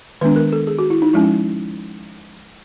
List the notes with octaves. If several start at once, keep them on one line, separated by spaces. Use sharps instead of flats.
D#3 G#3 B3 D4 B4
A#4
A4
G#4
F#4
E4
D#4
F3 G#3 C#4 E4